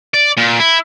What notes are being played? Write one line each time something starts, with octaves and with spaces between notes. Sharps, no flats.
D5
A#2
E4